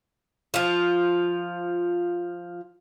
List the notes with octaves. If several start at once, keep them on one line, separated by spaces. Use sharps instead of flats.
F3 F4